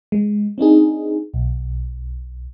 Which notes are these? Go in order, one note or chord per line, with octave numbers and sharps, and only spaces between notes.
G#3
C4 D4 D#4 G#4
B1